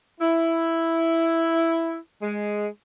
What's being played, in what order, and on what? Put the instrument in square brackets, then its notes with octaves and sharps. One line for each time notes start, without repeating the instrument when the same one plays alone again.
[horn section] E4
G#3